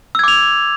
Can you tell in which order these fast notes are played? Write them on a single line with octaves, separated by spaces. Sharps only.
E6 G#6 D6 F7